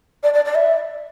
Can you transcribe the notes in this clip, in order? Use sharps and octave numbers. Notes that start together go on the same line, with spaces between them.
D5
D5
D5
E5